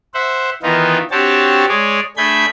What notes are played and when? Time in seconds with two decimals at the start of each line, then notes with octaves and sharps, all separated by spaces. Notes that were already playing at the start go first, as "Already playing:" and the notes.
0.14 C5 E5 F#5
0.63 D#3 E3 B3 D#4 F4
1.11 C4 D4 F#4 G4 C#5 A5
1.69 G#3 G#4 C#5 D5
2.17 A3 D4 G#4 B5 G6 G#6